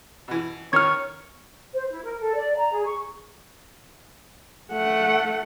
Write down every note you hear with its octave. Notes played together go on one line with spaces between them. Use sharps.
B2 E3
D#3 C#5 F6 G#6
C5
E4
A#4
A4
D5
A#5
G#4
C#6
A3 F#5